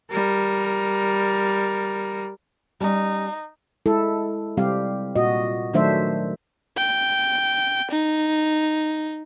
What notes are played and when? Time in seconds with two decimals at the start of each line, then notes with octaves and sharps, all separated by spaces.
0.11 G3 A#4
2.81 G3 C#4 D#4
3.86 G#3 E4 A4
4.57 C3 G3 C4 G4 F5
5.16 A#2 F#4 D#5
5.74 D#3 F#3 A3 D4 C5 E5
6.77 G5
7.91 D#4